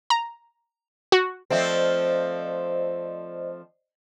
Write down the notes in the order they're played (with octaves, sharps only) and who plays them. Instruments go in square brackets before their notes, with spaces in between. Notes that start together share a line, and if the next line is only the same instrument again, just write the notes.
[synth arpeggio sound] A#5
F#4
[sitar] F3 A3 C4 [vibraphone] C5 D5 D#5